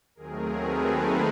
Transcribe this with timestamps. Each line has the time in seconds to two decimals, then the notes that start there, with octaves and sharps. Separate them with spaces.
0.15 D#2 D#3 F#3 A3 C4 G#4 A#4
0.56 A4 B4
0.96 A#4 C5